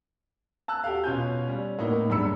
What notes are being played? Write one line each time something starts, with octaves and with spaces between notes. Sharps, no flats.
A5 E6 F#6
F#4 G4 A4 F5
B2 C#4 F4 G#5 G6
G3 C#4
A2 A#3 B3 D#4
F#1 G2 D5 B5 E6 C#7